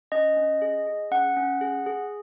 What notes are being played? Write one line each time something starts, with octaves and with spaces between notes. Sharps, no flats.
C#4 D#5
C#4
G#4
G#4
C#4 F#5
C#4
G#4
G#4